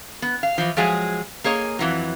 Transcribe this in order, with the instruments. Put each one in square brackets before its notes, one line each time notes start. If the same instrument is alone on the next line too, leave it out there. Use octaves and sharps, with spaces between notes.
[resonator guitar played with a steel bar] B3
F5
E3 F3
F3 F#3 G#3 G#4 G#5
A#3 G#4 C#5 D#5
F2 E3 F#3